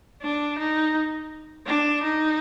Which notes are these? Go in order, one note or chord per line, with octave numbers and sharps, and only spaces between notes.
D4
D#4
D4
D#4